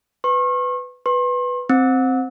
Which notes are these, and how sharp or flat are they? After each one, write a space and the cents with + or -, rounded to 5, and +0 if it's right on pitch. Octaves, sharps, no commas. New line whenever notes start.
B4 +15 C#6 -40
B4 +0 C6 +40
C4 +0 E6 -30